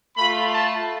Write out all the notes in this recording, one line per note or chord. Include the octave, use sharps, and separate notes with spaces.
A3 F4 B5
A5